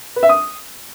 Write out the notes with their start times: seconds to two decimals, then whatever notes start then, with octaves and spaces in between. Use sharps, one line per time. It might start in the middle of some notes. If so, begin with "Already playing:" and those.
0.16 B4
0.23 E5
0.29 D#6